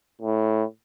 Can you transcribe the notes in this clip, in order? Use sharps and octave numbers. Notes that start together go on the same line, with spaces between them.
A2